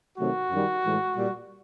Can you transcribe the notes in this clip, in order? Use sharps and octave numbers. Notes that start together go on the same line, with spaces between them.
C3 D#3 F#3 A3 F#4
F#2 D#3 G3
A2 E3 G#3
A#2 G3